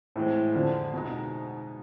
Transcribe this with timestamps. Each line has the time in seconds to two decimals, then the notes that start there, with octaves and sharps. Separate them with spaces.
0.16 A2 E3 G#3 C4
0.54 F2 D3 F3
0.93 B2 G#3 B3 D#4